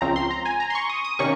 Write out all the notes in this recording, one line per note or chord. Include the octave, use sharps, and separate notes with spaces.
C#2 C#3 F3 C4 A#5
C6
A#5
G#5
A#5
C6
C#6
D#6
D#6
C3 D#3 A#3 C#4 C#6